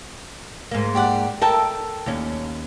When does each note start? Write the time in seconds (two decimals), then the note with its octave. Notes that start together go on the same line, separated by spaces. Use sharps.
0.71 G#2 A#3
0.95 G4 D5 F#5
1.42 A4 A#4 E5 G5 A5
2.06 D#2 C#4